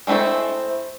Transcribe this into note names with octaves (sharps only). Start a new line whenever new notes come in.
G#3 A3 C4 E4 A4